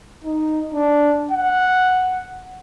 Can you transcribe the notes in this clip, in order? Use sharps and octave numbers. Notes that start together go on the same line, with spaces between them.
D#4
D4
F#5